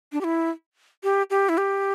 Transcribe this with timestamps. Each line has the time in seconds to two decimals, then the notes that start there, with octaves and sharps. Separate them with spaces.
0.13 D4
0.21 G4
0.24 E4
1.04 G4
1.30 G4
1.49 E4
1.58 G4